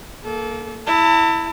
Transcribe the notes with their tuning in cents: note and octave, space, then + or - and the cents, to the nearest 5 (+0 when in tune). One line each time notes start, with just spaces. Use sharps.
A#3 -5 A4 -30
E4 +0 A5 +35